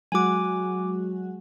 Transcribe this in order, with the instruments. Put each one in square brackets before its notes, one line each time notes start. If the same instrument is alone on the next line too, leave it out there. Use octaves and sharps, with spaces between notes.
[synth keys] F#3 G#3 F#4 [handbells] G#5 D6